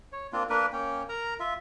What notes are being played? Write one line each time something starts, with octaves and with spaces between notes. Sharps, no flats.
C#5
A#3 C4 D4 F4
A#3 D4 A#4 B4
A#3 C#4 G5
A#4 A#5
F4 E5